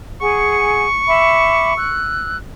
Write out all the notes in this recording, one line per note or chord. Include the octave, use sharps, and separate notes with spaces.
G#4 F#5 G#5 C#6
E5 B5 D6
E6 F#6